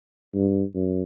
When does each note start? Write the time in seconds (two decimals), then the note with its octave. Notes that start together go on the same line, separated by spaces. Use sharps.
0.35 G2
0.75 F#2